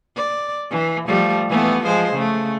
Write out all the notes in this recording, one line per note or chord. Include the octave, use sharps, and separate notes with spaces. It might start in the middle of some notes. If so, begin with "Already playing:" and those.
D5
E3
F3 G3 A3
E3 A3 B3
F3 G#3 C5
C#3 A3